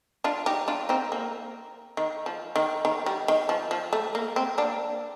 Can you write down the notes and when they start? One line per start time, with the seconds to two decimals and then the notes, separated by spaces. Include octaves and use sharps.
0.24 D4 F4
0.46 D#4 G4
0.68 D4 F4
0.89 C4 D#4
1.12 A#3
1.97 D#3
2.26 F3
2.56 D#3
2.85 D#3
3.06 G3
3.28 D#3
3.49 F3
3.71 F3
3.93 A3
4.15 A#3
4.36 C4
4.58 A#3 D4